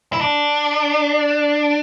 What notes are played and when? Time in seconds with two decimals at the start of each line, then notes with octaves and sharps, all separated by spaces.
0.13 E4
0.21 D4